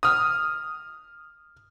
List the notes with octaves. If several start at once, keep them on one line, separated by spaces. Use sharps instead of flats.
D#6 F6